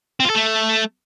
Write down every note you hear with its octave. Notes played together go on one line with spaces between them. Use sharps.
C4
F4
A4
A3